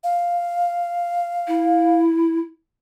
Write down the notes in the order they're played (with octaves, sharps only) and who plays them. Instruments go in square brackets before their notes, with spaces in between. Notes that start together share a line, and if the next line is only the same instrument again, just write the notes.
[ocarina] F5
[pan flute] E4